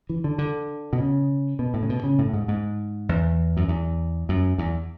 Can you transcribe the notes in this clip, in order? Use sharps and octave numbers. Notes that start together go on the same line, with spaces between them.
E3
D3
D3
B2
C#3
B2
A2
C#3
B2
C#3
A2
G#2
G#2
E2
F#2
E2
F#2
E2